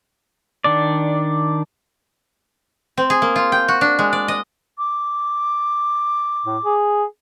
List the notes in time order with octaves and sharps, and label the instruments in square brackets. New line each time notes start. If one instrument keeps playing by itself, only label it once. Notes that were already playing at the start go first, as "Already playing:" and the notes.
[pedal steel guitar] D#3 D4 D5
[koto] C4
G#4
A#3
F4
G5
F#4
D4
G#3
D5
D#5
[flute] D6
[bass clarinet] A2
G#4